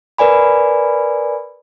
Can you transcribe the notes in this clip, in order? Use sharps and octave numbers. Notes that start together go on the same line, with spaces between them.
A#4 B4 D5 G#5 B5